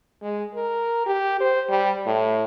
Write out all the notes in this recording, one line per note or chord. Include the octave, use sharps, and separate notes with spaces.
G#3
A#4
G4
C5
G3
A2